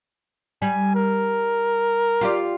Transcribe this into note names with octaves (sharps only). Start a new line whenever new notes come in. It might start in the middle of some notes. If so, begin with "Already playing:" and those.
G3 G#5
A#4
F4 G4 D5